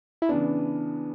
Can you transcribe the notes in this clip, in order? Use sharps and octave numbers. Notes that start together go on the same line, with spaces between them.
E4
C#3 E3 B3 D4